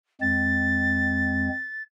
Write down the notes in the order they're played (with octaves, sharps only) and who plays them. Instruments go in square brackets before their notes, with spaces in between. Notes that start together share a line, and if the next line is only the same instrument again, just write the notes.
[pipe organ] F2 G#3 C4 [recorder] A6